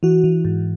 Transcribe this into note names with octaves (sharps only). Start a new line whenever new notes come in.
E3 F#4
E3
G#2